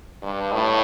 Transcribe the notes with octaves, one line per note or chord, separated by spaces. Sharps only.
G2
A2